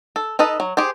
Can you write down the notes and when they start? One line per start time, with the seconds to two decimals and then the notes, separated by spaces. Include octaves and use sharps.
0.16 A4
0.39 D#4 A4 B4 D#5
0.60 F#3
0.77 G4 G#4 C5